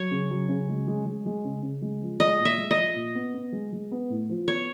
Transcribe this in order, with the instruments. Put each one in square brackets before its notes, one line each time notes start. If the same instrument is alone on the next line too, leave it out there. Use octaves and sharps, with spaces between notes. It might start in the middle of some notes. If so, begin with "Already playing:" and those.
Already playing: [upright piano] F#3 [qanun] C#5
[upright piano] C#3
F#3
C#3
G#3
G#3
G#3
G#3
C#3
C#3
G#3
F3
[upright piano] G#3 [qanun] D#5
[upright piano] A#2
[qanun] E5
[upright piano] G#3
[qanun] D#5
[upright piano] F3
A#2
B3
B3
G#3
G#3
B3
A2
F3
[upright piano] B3 [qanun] C#5